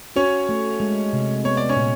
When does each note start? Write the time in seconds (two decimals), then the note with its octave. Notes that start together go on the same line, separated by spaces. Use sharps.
0.16 C#4 F#4 C#5
0.49 A3
0.80 G#3
1.13 C3
1.44 B3 C#5
1.57 D5
1.69 C#4 C#5
1.77 A#2